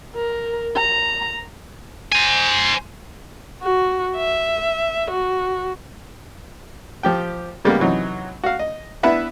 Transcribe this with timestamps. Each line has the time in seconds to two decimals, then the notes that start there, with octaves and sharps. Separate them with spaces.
0.15 A#4
0.76 A#5
2.12 C5 G#5
3.63 F#4
4.16 E5
5.11 F#4
7.03 F3 G4 G5
7.65 C#3 G3 G#3 A#3 B3
7.79 C3 E3 F#3 D#4
8.44 F#4 F5
8.59 D#5
9.03 B3 D4 E4 B4 E5 F#5